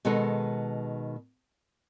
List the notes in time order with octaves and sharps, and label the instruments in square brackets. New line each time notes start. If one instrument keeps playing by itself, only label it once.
[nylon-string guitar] B2 D#3 G#3 B3 A4